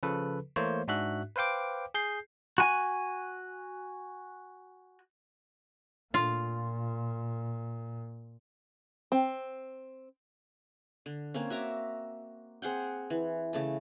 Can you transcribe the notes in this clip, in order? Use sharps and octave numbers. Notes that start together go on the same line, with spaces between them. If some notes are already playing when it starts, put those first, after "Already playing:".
C#3 F3 A4 B4
E3 A3 A#3 C5 C#5
G#2 D4 F#4 E5 F#6
B4 C5 F5 G5 D6
G#4 G6 C7
F#4 G#5
A#2 F4
C4
D3
A#3 C4 C#4
F#4 E5 A#5 D6
C4 G#4 F#5 G5
E3
C#3 A3 A5